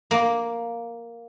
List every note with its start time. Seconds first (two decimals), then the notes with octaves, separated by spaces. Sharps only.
0.11 A#3